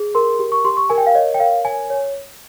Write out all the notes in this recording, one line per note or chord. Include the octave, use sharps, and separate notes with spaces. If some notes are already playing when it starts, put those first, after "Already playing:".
Already playing: G#4
A#4 C6
G4
C#6
G4 C6
C#6
A#4 G#5
G5
F5
C#5 D#5
G5
A#4 F5
C#5 G#5
C#5